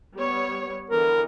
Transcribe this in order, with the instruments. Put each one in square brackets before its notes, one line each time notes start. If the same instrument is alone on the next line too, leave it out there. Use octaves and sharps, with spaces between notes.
[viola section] G3 B3 C#5
[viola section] D3 E3 B3 [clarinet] A#4